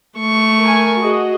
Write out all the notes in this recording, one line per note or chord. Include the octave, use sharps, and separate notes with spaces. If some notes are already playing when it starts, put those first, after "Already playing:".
A3 C#6
A#4 G#5
F#4 G#4 D#5